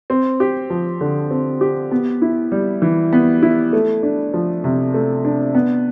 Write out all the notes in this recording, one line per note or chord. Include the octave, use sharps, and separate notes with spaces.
C4
G4
F3
D3
C4
G4
B3
E4
G3
E3
B3
E4
A3
D4
F3
C3
A3
D4
B3